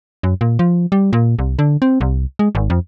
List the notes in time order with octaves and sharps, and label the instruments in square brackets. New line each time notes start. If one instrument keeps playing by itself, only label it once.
[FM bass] F#2
A#2
F3
G3
A#2
C2
D3
C4
C2
G#3
G#1
F2